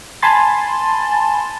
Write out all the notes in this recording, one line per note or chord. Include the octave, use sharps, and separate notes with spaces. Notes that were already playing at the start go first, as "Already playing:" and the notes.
G#5 A5 B5 C6 A6